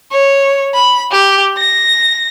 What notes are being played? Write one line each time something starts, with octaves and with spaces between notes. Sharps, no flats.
C#5
B5
G4
A#6